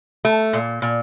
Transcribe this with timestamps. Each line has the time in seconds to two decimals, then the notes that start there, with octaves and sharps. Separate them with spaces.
0.25 A3
0.53 A#2
0.82 A#2